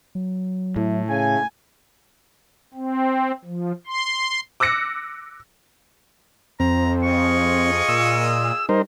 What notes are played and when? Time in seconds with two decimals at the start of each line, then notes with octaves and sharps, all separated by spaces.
0.15 F#3
0.76 A2 E4
1.09 C#3 G#5
2.74 C4
3.45 F3
3.87 C6
4.60 D6 E6 F#6 A#6 C#7
6.60 F2 C4 A#5
7.03 F4 G#4 D#5 C#6
7.89 A#2 E6
8.69 G3 D#4 A#4 C5